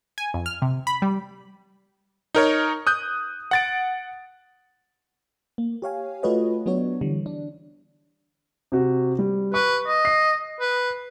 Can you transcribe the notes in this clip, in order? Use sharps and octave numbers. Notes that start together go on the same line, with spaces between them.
G#5
F2
F6
C3
B5
G3
D#4 A#4 C#5
D#6 F#6 G6
F#5 A6 D7
A#3
G4 C#5 F5 G#5
A3 F4 F#4 B4 C#5 D#5
F#3 B3 D4 F#4 C#5
D3 E3 G3
D4
C3 F#4
G3
B4 C#6
D#5
C7
B4